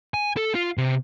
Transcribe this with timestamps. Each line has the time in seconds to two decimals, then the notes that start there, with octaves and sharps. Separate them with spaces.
0.14 G#5
0.37 A4
0.55 F4
0.78 C3